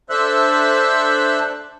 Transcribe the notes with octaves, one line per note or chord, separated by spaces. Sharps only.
D4 A4 C5 E5 E6 F#6